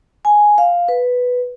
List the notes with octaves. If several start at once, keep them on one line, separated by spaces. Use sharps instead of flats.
G#5
F5
B4